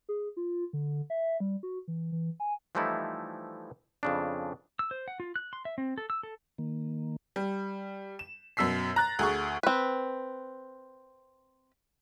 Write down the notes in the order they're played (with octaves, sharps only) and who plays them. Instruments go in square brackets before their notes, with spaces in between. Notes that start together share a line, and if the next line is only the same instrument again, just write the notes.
[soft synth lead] G#4
F4
D3
E5
G3
F#4
E3
E3
G#5
[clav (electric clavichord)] E3 F3 G3 A3 D#4 E4
F2 C#3 D4
[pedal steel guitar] E6
C5
F#5
F4
F#6
C6
E5
C4
A4
E6
A4
[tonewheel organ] D#3 A#3
[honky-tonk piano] G3
E7
F#2 B2 E6 B6 C7
A#5 F#6 A6
D2 G#4 C#6
[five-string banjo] C4 B4